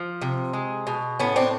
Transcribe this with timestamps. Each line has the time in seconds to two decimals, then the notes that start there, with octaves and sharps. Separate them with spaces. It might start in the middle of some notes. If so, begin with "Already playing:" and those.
Already playing: F3
0.22 C3
0.53 G#3
0.87 B2
1.19 A2 B3 C#4
1.36 C4 D4